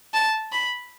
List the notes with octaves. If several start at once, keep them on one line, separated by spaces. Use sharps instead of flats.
A5
B5